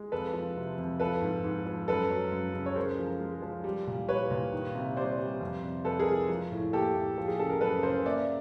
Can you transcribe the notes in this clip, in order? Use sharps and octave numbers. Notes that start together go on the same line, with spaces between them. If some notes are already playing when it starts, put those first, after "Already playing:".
Already playing: G#3
F2 A4 B4
F3
C3
F2
F3 A4 B4
G#2
G#2
F3
F#2 A4 B4
F#3
F#2
C#3
C#5
G#3 A#4 C5
F3
G#3
F3
G3
A#2
G3 B4 C#5
A#2
D#3
C3
G3 C5 D5
G3
F2
C3
F2 A4 B4
G#4 A#4
G#3
F3
A2
A#3 G4 A4
A2
F3
G#4
C#3 A4
A#4
F#2 A4 B4
C#3 A#4 C5
A#3 D5 E5